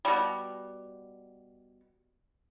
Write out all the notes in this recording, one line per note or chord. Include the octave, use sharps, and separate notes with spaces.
B2 G3